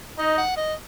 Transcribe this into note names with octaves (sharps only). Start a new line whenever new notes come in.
D#4 D#5
F#5
D#5